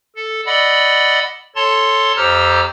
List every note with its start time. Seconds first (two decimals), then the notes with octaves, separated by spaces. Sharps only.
0.16 A4
0.46 D5 D#5 F#5 B5 E6
1.56 A4 C#5 A5 C6 A6
2.17 F2 G4 C5 A#5 E6 F6